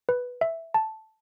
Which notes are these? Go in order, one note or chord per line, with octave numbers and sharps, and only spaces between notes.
B4
E5
A5